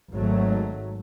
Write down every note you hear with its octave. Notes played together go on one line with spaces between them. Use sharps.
G#1 G#2 F#3 A3